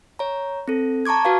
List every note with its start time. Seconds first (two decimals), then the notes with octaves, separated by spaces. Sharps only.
0.19 C#5 A#5
0.68 C4 A4
1.05 A5 A#5 C#6 D6 G#6
1.25 F#4 B4 F5